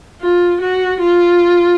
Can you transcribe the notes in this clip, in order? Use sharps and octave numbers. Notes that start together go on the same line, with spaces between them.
F4
F#4
F4